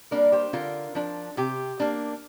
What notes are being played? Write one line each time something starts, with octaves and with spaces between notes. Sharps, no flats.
G3 A#3 D4 A#4 D5
A#4
G4 C5
D3 F4 A#4
F3 D4
C3 G4
A#3 D4